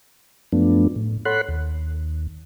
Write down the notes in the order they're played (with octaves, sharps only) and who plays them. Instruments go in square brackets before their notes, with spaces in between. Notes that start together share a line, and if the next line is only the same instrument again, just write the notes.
[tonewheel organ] F#2 F3 A3 B3 D4
A2
A4 C#5 F#5 B5 C6 F#6
D#2